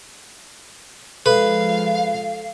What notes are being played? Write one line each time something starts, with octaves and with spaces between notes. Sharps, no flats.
F3 G#3 A4 B4 F5